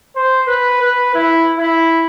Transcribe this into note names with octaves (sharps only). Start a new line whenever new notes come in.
C5
B4
B4
E4
E4